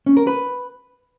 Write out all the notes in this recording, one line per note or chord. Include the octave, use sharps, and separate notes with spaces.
C#4
A#4
B4